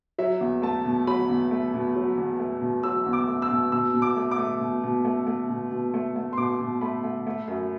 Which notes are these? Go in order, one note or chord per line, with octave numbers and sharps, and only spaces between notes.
F#3 E5
E2
A3 A5
B2
F#3 B5
E2
A3
B2
F#3
E2
A3
B2
F#3 E6
E2
D6
A3
E6
B2
B2 E6
B2
D6
A3
D6
A3
B2
B2
A3
A3
B2
B2
A3
A3
C6
B2 D6
B2
A3 B5
A3
A3
F#2